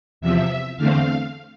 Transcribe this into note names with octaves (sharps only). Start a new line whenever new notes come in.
E2 C3 F3 E5
E2 D3 A3 C4 F5